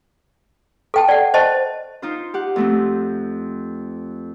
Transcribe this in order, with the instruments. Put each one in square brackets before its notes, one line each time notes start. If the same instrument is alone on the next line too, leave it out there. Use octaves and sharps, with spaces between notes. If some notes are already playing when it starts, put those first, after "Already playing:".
[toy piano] A4 G5 A5
D5 F#5
C5 D#5 A5
[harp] D#4 F4 C5
G4 F#5
F2 A3 C4